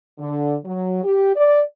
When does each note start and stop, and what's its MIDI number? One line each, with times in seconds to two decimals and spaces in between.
0.19 0.54 50
0.65 1.03 54
1.04 1.33 67
1.35 1.60 74